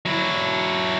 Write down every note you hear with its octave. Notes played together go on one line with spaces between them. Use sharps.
F#3 E4